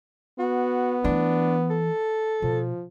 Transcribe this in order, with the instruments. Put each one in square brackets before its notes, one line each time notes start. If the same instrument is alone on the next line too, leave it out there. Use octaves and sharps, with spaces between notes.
[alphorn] B3 [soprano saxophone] F#4
[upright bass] E3 A3 [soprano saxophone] D4
[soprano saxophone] A4
[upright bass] B2 [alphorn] F3